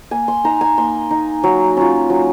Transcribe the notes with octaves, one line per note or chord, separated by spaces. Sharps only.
A#3 G#5
C6
D#4 A#5
G#5
A#3 C6
D#4
F#3
C#4 F4
F#3